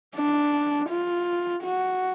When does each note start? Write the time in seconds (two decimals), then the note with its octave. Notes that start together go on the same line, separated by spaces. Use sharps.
0.15 D4
0.89 F4
1.63 F#4